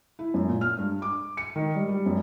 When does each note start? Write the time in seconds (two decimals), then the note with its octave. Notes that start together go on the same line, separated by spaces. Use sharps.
0.19 E4
0.34 F#2
0.49 A#2
0.61 F6
0.79 G2
1.02 D6
1.37 C#7
1.56 D#3
1.75 G3
1.89 G3
2.06 F#2